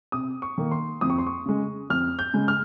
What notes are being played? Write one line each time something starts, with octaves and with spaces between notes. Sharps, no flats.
C3 D#6
C#6
D#3 A#3
C6
F2 D#6
C#6
C6
C#6
C#3 G#3
F2 F6
G6
C#3 G#3
F6